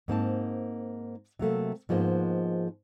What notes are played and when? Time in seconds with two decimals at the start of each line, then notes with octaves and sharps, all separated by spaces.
0.08 G#2 A#3 C4 A5
1.39 C3 F#3 A3 A#3
1.89 G#2 F3 G#3 A#3 B3